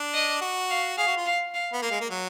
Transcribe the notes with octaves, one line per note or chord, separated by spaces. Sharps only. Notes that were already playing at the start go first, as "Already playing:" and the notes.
Already playing: D4
D#5
F#4
F5
G#4 F5
F#4
F4
F5
F5
B3
A#3 F5
G#3
A#3
F#3